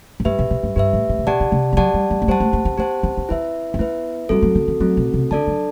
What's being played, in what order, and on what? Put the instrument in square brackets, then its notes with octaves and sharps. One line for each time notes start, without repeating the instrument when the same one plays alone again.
[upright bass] A2
[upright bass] G2 [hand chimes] G4 B4 E5
[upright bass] B2
B2
G2
[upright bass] G2 [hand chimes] G4 B4 E5
[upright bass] A2
A2
C3
[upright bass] B2 [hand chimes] G4 D5 F#5 A5
[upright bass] D3
C3
G3
[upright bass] F#3 [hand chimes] G4 D5 F#5 A5
[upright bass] G3
G3
A3
[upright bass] G3 [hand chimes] G4 C5 F#5 A5
[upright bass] A3
A3
C4
[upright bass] B3 [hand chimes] G4 C5 F#5 A5
[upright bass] C4
B3
[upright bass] C4 [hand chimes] E4 B4 E5
[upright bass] C4
[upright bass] B3 [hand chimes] E4 B4 E5
[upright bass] G3 [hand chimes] A3 C4 F#4 A4
[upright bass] F#3
D3
E3
[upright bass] F#3 [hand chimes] A3 C4 F#4 A4
[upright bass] B2
C3
[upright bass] D3 [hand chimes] D4 A4 D5 A5
[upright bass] F#3